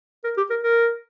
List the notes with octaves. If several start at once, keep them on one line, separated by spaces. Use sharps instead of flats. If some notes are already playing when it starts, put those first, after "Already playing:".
A#4
G4
A#4
A#4